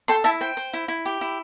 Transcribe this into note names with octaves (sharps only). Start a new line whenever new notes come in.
A4 G5 C6
E4 E5 A5
C5 G5
C5
E4
E4
G4
E4